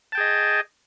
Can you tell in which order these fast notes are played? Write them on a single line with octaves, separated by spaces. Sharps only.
A5 G5 G#4 D#5